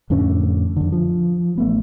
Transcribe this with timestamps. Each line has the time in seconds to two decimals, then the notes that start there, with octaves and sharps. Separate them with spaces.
0.10 F2 A2 D3 C#4
0.77 F2 D3
0.92 F3
1.58 A1 A3 B3